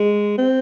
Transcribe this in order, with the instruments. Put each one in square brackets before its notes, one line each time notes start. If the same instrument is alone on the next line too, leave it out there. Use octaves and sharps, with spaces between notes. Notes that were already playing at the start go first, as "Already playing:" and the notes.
Already playing: [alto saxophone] G#3
C4